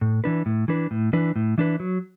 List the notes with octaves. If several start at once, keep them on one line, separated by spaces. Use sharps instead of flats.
A2
E3 D4 B4
A2
E3 D4 B4
A2
E3 D4 B4
A2
E3 D4 B4
F#3